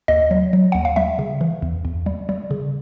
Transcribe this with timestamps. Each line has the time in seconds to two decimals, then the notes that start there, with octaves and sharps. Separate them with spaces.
0.08 D#2 D#5
0.31 F#3
0.53 F#3
0.72 D#2 F#5
0.85 F5
0.96 G3 E5
1.19 C#3
1.41 E3
1.62 E2
1.85 E2
2.06 G3
2.29 G3
2.51 C#3